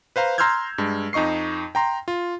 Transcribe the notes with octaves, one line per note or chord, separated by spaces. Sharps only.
B4 C5 F5 A#5
A#5 C6 E6 F6 G6 G#6
G2 G#3
F2 D#4 D#5 C#6 C7
G5 A#5 C6
F4